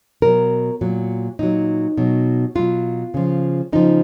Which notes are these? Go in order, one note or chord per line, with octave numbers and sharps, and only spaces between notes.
B2 F#3 A#4
A#2 F#3
A#2 F#3 D#4
B2 F#3
B2 F#3 F4
C#3 F3
C#3 F3 D#4